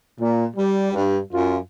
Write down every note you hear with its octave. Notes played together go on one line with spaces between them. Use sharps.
A#2
G3
G2
F#2 F4